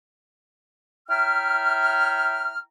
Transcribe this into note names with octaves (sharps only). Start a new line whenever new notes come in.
E4 C#5 E5 G5 A#5 F6